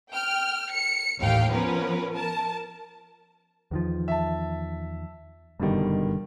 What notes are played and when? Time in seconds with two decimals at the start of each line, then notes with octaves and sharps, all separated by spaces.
0.11 G5 F6
0.71 C#7
1.20 A1 D#2 F5 G5
1.51 F3 B3 C#4 A#4 B4
2.13 A#4 A5
3.71 E2 D#3 F3
4.08 E5 A5
5.60 F#1 G2 B2 D3 D#3 G3